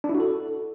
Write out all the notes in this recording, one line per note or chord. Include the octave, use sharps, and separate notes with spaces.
D4
E4
F#4
A4